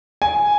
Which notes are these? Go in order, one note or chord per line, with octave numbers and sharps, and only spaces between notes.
G#5